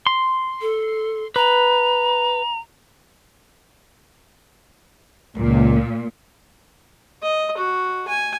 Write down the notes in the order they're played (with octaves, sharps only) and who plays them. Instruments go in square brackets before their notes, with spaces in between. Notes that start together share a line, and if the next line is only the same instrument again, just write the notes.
[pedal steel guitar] C6
[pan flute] A4
[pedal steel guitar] B4 [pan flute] A#5
[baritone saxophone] C#2 [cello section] A#2
[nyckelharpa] D#5
F#4
G#5